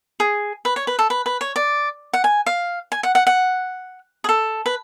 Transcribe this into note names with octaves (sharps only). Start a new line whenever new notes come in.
G#4
B4
C#5
B4
A4
B4
B4
C#5
D5
F#5
G#5
F5
G#5
F#5
F#5
F#5
G#4
A4
B4